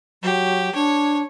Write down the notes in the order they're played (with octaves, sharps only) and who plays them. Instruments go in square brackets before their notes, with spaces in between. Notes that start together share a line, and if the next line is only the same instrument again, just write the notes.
[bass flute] F#3 [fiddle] G4
[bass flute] D4 [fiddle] C#5